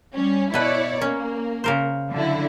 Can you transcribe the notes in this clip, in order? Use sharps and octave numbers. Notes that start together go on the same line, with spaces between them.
G3 C#4
B2 E4 B4 C#5 D5
A#3 C#4
C#3 A#4 C5
D3 F#3 E4